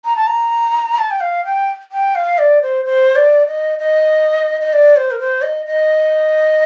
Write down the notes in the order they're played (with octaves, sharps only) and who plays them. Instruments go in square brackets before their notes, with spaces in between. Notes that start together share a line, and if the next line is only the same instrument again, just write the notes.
[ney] A#5
A5
A#5
A5
G5
F5
G5
G5
F5
D5
C5
C5
D5
D#5
D#5
D#5
D5
C5
A#4
C5
D#5
D#5